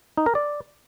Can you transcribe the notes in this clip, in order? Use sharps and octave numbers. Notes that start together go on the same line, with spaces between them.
D#4
A#4
D5